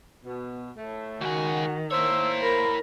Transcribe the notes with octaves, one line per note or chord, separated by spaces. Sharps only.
B2
A2 A3
C#2 D#3 F#4 G#4
A#3 E4 C5 C#5 E6
A#4 B5